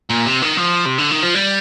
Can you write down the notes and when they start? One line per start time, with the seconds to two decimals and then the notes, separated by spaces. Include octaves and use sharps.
0.10 A#2
0.26 C3
0.42 D#3
0.57 F3
0.85 C3
0.98 D3
1.10 D#3
1.23 F3
1.35 G3